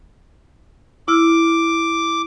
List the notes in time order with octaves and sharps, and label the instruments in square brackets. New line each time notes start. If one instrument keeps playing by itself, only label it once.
[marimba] E4 E6 F6 [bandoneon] D6